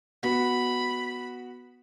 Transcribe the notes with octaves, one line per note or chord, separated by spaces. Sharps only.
B3 F#4 B5